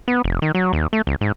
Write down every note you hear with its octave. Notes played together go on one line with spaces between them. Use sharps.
B3
F1
D#3
F#3
D#2
A3
C#2
G#2